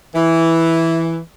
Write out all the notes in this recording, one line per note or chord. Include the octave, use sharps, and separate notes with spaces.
E3